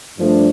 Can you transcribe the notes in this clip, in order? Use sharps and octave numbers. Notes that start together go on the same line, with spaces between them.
G2 F3 A3 D4